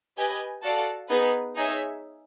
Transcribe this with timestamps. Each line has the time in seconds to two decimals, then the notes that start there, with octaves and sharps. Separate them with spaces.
0.17 G4 B4 D#5 G#5
0.62 F#4 A4 D5 F5 A5
1.08 B3 D#4 G#4 B4
1.55 D#4 G#4 C#5 E5